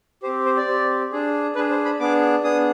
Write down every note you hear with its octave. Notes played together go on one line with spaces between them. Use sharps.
C4 G4 C5
C5
D5
C4 G4
D4 G#4
D4 G#4 B4
C5
B5
B3 D4 G#4 D6
B3 D4 G#4 D#6